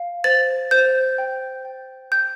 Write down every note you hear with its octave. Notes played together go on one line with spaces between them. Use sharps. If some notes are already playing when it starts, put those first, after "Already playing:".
Already playing: F5
C5 A6
C5 G6
G5
G5
G5 G6